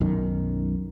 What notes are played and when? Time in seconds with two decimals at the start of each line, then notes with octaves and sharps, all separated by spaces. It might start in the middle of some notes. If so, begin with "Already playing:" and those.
0.01 B1 F#2 D#3